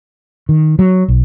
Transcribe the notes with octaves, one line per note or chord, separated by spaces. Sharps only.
D#3
F#3
B1